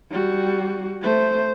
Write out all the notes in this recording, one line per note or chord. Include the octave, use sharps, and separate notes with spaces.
G3 F#4
A3 C5